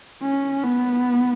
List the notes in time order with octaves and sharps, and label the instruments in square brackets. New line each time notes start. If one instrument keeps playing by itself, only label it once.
[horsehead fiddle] C#4
B3